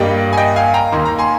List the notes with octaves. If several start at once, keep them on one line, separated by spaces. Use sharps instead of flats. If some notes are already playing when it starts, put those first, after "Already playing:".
Already playing: G2 G3 A#3 D#5 G5
G#5
D#5 G5
F5 G#5
G5 A#5
D#2 D#3 A#3 C6
A#5
G#5 C6